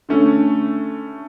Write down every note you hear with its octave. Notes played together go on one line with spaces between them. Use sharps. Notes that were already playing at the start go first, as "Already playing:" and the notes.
D3 A3 C#4